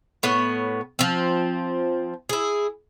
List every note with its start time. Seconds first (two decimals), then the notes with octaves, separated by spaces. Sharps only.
0.23 A2 B3 C#5
0.99 F3 C4
2.29 E4 G#4